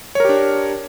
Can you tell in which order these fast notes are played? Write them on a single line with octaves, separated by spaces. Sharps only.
C#5 A#4 G4 D4